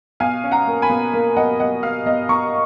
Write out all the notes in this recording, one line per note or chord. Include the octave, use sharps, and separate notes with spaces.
B2 F5 G#5
C#4
F#5 A#5
A#3
G#5 B5
B2
A#3
B2 D#5 F#5
B2 D#5 F#5
B2 F5
B2 D#5
B2 A#5 C#6